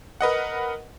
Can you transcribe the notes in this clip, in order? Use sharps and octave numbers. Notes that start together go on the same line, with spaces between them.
A#4 B4 D#5 F#5